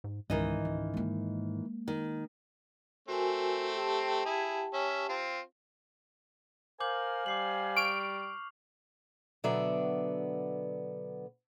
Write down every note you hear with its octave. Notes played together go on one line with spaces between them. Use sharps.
G#2
C#2 G#2 D#3 E3 D#5
C#2
G#3 A#3
D#3
A3 C4 F#4 A#4 G#5
G4 G5 A5
E4 G#4
C#4 E5
C4 F4
A#4 C5 F5 G#5 D6 G6 F#7
G3 D6 C7 F#7
C#6 F6 D7 F7
B2 D3 F#3 B3 D5 E5